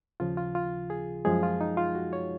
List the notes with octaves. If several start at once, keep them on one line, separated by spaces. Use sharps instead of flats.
D#2 C#3 F3 F4
F4
F4
G#4
F#2 F3 G#3 G#4
F4
D#4
F4
F#4
C#5